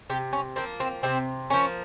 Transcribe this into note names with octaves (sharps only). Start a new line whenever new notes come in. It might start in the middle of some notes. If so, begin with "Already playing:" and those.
C3 G4
C#4
F3 A#3 C4
C4
C3 C4
F3 A#3 C#4